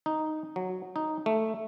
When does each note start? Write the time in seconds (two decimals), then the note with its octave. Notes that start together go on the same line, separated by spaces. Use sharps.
0.06 D#4
0.56 F#3
0.96 D#4
1.26 A3